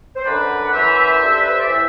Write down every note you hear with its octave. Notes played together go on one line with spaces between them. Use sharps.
C5
F#2 D3 B4 D5
F#5
F#2 E3 C5 E5
G2 D3
A4
B4
C5
D5
A2 E3 C5 E5